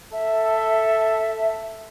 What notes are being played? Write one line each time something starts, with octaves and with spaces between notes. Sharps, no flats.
A4 E5